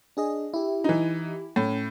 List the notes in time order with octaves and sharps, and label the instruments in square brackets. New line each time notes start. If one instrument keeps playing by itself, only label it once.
[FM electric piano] D4 G#4 D#5
E4 G4
[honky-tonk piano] E3 D#4
[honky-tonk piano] A2 [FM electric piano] C#4